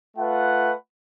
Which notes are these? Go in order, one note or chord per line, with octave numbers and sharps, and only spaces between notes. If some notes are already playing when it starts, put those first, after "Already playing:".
A3 F4 B4 F#5